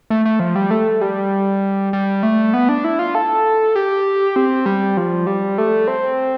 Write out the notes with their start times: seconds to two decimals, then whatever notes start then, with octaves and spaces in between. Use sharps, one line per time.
0.10 A3
0.25 A3
0.40 F3
0.55 G3
0.71 A3
1.01 G3
1.93 G3
2.23 A3
2.54 B3
2.69 D4
2.84 E4
2.99 F4
3.15 A4
3.75 G4
4.36 C4
4.66 G3
4.97 F3
5.27 G3
5.58 A3
5.88 C4